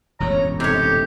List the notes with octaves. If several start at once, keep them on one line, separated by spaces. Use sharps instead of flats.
E1 A1 F#2 C#5 A#5
C3 D#4 G4 A4 C#5